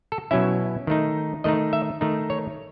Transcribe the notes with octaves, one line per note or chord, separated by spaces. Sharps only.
A4
B2 F#3 C#4 E4 E5
D#3 A3 D#4
D#3 A3 D#4 D#5
E5
D#3 A3 D#4
C#5